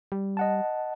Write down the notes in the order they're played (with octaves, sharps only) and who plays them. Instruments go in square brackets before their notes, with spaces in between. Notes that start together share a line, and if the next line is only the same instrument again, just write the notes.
[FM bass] G3
[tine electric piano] D#5 F#5 A5